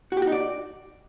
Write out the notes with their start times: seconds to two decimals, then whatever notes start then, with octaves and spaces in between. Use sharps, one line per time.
0.12 F#4
0.17 G4
0.22 F#4
0.27 D#4
0.32 D5